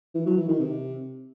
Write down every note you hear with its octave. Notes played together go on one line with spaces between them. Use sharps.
E3
F#3
E3
D#3
C3